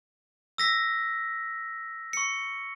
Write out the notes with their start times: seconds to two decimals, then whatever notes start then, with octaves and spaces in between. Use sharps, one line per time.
0.58 E6 A#6 B6
2.13 C#6 C#7